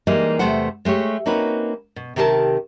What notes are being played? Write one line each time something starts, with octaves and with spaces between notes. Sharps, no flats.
E3 G3 G#3 A#3 D#4 D#5
E2 C3 A3 A4 C5 F#5
G#3 A3 G4 C#5
A#3 C4 C#4 D#4 F#4 B4
B2
C3 D#3 G4 A4 A#4 A5